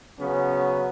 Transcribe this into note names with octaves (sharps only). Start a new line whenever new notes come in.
C#3 F#3 B3 C#4